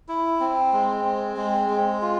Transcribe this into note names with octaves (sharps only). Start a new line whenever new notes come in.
E4
C4
G#3
C4
G#3
G#3
F4